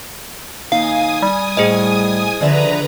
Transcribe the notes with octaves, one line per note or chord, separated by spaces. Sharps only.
D#2 D#4 F5 G#5 D#6
G3
A2 G#4 C5 D#5
D3 F3 B4 D5 E5 A#5